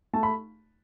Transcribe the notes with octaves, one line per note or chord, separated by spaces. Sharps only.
A3 A5
B5